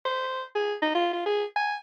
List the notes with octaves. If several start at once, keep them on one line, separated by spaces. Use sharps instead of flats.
C5
G#4
D#4
F4
F4
G#4
G#5